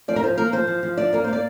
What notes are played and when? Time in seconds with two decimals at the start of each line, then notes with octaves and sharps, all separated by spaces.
0.08 F3 D5
0.16 A#4
0.23 F3 C5
0.38 A#3 A#4
0.52 F3 C5
0.67 F3
0.83 F3
0.98 D4 D5
1.13 A#3 A#4
1.24 C5
1.28 A#3 D5